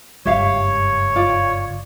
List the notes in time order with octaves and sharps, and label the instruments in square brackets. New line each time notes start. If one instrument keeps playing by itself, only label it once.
[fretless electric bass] F#1 G2 G#3 [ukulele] G4 E5 F5 [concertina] C#5
[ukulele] F4 D5